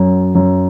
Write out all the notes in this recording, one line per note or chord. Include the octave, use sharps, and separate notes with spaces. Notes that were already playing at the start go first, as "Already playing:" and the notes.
Already playing: F#2 F#3
F#2